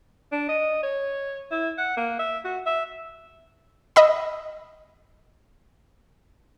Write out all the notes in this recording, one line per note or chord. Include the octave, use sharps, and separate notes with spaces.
D4
D#5
C#5
E4
F#5
A#3
E5
F#4
E5
D#5 E5 B5